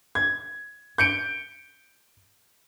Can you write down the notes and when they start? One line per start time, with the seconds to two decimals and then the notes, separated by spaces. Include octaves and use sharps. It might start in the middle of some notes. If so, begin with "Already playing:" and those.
0.15 G#6
0.98 G6 C#7 D7